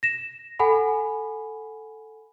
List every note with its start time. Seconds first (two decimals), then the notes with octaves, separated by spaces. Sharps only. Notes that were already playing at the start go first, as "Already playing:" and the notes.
0.03 A#6 E7
0.59 A4 F#5 G#5 B5